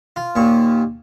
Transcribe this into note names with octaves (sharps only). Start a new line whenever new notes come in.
F4
D#2 A#2 C#6